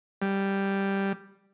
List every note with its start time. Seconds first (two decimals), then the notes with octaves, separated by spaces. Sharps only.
0.22 G3